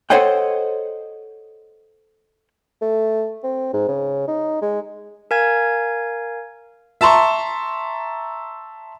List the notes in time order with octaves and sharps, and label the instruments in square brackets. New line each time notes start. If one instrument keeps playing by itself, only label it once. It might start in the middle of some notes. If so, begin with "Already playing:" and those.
[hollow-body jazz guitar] A4 C5 C#5 D#5 F#5 G5
[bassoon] A3
C4
G#2
C#3
D#4
G#3
[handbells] A#4 F5 G#5 G#6
[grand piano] E5 A5 A#5 C6 C#6